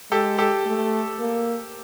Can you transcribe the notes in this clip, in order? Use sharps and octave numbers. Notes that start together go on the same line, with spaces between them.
G#3 G4 A4
G4 A4
A3
A#3